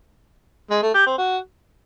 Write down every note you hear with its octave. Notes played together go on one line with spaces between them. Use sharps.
G#3
A3
G4
C4
F#4